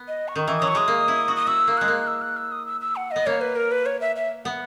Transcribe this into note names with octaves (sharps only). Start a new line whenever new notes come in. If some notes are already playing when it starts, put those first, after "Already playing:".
Already playing: B3
D#5
C#6
D#3
E3
F#3 D#6
C#6
G#3 D#6
A#3
E4
F#4
D#6
F#4 E6
A#3
G#3 F#6
A#3
E6
F#6
E6
D#6
E6
E6
F#5
B3 D#5
A#3 C#5
B4
A#4
B4
C#5
E5
E5
B3 F#5